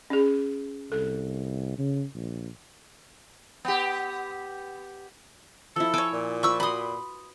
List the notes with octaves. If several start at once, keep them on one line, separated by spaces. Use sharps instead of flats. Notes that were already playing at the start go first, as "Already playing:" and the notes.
C#4 G#4
C2 A4
C#3
A#1
B3 G4
F3 E4 A4
C#5 G#5 A5 D6 E6
A#2
F3 B5 C#6 E6
F#4 B4 B5 C6 D#6